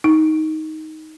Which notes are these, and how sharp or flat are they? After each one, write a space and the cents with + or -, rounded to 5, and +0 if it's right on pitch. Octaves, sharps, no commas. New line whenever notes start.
D#4 +10